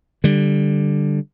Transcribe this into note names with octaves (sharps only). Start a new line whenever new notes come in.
D3 G3